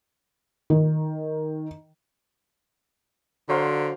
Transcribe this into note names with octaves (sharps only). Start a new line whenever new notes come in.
D#3
D3 F#3 C5 F5